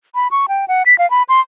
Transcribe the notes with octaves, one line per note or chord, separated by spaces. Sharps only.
B5
C#6
G5
F#5
B6
F5
B5
C6